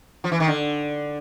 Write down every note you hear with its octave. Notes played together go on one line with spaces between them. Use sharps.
F3
E3
D#3
D3